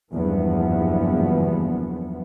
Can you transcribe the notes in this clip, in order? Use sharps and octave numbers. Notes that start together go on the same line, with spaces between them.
F#1 E2 G2 E3 F3 B3